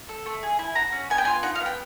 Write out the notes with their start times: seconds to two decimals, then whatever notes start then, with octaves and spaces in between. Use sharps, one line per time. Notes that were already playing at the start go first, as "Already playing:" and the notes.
0.09 A4
0.26 A3
0.43 G#4
0.59 E4
0.75 F#4 A#5
0.92 C#4
1.10 B3 G#5
1.18 G5
1.25 F4 G#5
1.43 D#4 F#5
1.55 F5
1.61 B3
1.66 G5